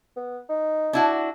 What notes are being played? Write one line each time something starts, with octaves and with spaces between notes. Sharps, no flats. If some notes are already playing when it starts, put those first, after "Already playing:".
B3
D#4
D4 E4 F#4